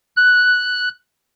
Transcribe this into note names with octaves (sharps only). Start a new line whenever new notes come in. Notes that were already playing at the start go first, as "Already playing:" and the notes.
F#6